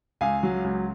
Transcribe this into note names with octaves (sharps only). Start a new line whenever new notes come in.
C#2 F5 G#5
F#3
C#2